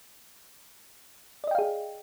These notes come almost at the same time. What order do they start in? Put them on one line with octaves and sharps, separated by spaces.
D5 D#5 G5 F5 G#4